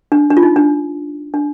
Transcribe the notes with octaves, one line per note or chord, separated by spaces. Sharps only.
D4
D4
F4
D#4
D4
D4